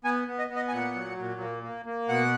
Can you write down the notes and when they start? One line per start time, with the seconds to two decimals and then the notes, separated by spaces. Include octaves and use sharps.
0.05 B3 G#5
0.28 B3
0.39 D#5
0.50 B3
0.56 D#5
0.68 G#5
0.72 A#2 F#5
0.95 F#3
1.18 A#2
1.41 A#3
1.63 A#3
1.86 A#3
2.08 B2 F#5